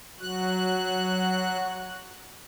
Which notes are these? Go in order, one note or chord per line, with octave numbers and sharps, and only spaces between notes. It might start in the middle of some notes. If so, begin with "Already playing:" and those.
F#3 F#4 F#6